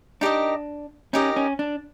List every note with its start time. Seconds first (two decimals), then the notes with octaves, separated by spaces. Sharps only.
0.21 D4 D#4 G4 A#4 D#5
1.13 C#4 D#4 G4 A#4 D#5
1.36 C#4
1.59 D4